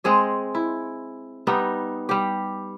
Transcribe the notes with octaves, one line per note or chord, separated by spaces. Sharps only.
G#3 C4 G#4 D#5
E4
G3 B3 D#4
G3 G4